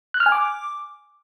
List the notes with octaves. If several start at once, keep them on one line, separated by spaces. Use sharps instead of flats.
F#6
F6
G#5
D6